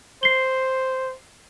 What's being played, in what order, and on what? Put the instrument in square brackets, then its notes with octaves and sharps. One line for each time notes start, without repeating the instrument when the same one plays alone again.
[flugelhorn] C5 [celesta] C7 G7